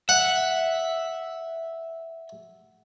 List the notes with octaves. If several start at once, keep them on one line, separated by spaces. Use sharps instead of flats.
E5 F#5